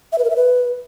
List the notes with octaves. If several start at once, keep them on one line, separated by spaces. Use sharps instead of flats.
E5
B4
A#4
E5
B4